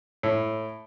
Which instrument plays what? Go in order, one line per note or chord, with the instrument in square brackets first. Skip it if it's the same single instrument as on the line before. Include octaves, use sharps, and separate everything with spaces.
[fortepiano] A2